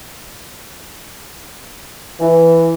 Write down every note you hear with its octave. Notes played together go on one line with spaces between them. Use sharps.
E3